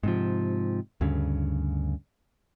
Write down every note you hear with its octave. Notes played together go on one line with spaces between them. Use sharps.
G#2 C3 F3
D2 G2 C#3